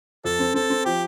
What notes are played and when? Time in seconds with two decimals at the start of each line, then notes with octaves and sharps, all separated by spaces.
0.24 F2 A4
0.39 C4
0.54 C4 A4
0.70 C4
0.85 F3 G4